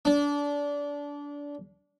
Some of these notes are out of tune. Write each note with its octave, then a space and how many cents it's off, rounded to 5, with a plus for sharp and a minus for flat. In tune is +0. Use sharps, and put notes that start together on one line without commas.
D4 -25